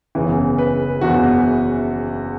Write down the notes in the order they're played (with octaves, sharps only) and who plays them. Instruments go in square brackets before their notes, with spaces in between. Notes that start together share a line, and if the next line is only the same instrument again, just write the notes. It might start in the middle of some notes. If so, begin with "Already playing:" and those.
[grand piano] F#1 E2 C#3 E3
B4
F#1 E2 C#3 E3 F#4